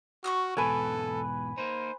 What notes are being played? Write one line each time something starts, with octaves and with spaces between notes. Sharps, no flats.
F#4 C#6 D#6 F6
E2 G#2 B2 A4 B4 G#5
A#3 D#4 C5